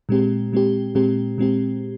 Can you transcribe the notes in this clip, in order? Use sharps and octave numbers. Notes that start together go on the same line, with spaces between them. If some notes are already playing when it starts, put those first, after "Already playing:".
A#2 G#3 C4 G4
A#2 G#3 C4 G4
A#2 G#3 C4 G4
A#2 G#3 C4 G4